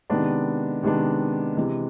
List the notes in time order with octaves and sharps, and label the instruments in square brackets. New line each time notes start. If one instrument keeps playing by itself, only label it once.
[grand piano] C3 D#3 G#3 B3 D4
C3 D#3 G#3 B3 D4
C3 E3 G#3